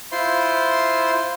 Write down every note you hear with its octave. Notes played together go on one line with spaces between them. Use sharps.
E4 F4 C5 C6